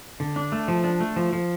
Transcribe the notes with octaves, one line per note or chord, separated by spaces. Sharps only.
D3
D4
A3
F3
D4
A3
F3
F3